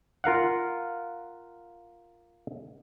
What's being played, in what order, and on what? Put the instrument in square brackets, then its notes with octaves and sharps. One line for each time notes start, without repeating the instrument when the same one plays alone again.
[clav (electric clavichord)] F4 A#4 F5 F#5